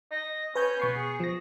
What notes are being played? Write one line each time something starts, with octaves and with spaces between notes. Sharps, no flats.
D#5
C#4 B4 G#5 G6
B2 B3 C#6 C7
G#4
F3 A#6